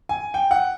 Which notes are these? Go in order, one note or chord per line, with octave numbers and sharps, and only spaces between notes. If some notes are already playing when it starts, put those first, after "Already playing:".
G#5
G5
F#5